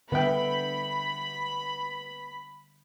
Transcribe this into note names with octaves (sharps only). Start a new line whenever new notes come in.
D3 G3 B3 E5 G5 B5